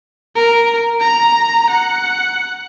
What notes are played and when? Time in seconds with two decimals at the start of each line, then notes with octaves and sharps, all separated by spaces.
0.36 A#4
1.00 A#5
1.70 F#5